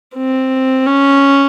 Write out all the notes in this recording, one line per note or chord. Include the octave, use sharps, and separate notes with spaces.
C4
C#4